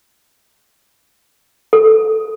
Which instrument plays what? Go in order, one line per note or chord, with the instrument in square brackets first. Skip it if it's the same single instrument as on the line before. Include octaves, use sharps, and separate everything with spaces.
[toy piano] A4